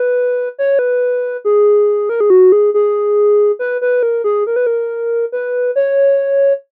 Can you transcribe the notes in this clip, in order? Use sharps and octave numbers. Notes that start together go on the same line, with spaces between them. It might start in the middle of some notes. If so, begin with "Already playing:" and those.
Already playing: B4
C#5
B4
G#4
A#4
G#4
F#4
G#4
G#4
B4
B4
A#4
G#4
A#4
B4
A#4
B4
C#5